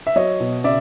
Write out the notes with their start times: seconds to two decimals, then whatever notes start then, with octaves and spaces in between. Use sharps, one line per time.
0.07 E5
0.16 F#3 C#5 D#5
0.40 B2
0.64 C#3 D5 E5